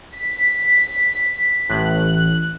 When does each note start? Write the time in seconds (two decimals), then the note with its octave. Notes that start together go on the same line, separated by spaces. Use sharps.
0.16 B6
1.69 A1 F#6